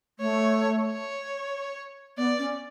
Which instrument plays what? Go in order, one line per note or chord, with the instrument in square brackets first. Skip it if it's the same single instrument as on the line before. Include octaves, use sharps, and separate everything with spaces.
[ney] A3 [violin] C#5
[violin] C#5
[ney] B3 [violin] D5
[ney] C#4